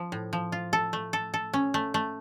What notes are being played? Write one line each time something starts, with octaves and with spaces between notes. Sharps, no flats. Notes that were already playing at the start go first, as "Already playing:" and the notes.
Already playing: F3
A2
F3
F4
A4
A3
A4
A4
C#4
A3
A3